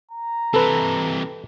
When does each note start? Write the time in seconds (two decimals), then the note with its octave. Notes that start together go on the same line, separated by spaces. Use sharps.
0.11 A#5
0.54 C3 E3 A4 B4